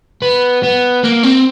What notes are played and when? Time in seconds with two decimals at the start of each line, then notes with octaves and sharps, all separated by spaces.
0.22 B3
0.63 B3
1.03 A#3
1.23 C4